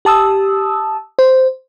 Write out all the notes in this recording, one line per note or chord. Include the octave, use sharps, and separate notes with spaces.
G4 A5 D#6 E6
C5